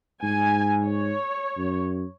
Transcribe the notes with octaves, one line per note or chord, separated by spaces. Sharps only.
G#2 G#5
C#5
F#2